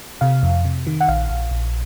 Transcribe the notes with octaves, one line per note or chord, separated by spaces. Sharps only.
C3 F5
F2
C3
D#3
F#5
A#1 F5
A#1
A#1